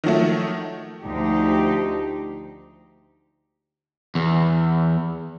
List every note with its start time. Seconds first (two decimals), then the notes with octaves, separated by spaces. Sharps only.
0.04 D#3 F3 F#3 A3
1.04 D2 F3 D#4 G4
4.15 E2